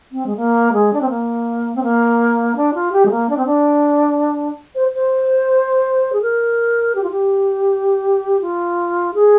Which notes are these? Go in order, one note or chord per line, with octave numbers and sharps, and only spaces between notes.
C4
G#3
A#3
G#3
D4
C4
A#3
C4
A#3
D4
F4
G4
G#3
A#3
D4
C4
D4
C5
C5
G#4
A#4
G4
F4
G4
F4
G#4